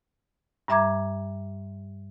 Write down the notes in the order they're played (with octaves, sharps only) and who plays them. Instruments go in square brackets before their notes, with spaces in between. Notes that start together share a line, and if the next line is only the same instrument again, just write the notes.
[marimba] G2 G3 E5 A#5 D6 G#6